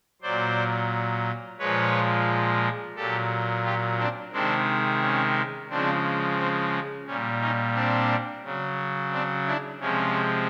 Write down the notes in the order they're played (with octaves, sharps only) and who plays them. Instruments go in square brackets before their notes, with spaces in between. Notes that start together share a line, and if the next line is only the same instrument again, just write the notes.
[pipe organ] A#2 F#3 C5 D5
A#2 F3 G#3 B4 C#5
A#2 F#3 G4 A4
F4 G4
C4 D4
C3 D#3 G#3 C4 D4
C#4
C#3 F3 G#3 C4 D4
C4
A#2 G3 C#4
C#4 D#4
C4 D4
C#3 F#3
C4 D4
D4 E4
C3 F3 G#3 C#4